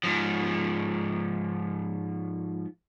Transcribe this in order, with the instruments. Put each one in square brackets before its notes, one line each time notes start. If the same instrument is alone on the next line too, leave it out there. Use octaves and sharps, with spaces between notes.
[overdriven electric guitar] G#2 F3